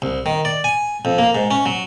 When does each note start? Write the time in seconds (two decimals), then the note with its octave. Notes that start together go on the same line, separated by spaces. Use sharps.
0.02 C2
0.26 D#3
0.45 D5
0.64 G#5
1.05 F2
1.18 A#3
1.35 G#2
1.51 C#4
1.66 F#3